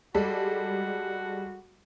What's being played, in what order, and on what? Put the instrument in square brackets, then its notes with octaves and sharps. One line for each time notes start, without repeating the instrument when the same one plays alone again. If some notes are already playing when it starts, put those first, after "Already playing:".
[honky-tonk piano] G3 G#3 A4 [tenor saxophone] F#4